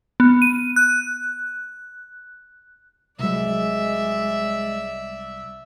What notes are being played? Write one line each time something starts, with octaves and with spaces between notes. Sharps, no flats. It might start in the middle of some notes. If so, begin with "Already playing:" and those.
B3
D#7
F#6
C2 F#3 G#3 D5 E5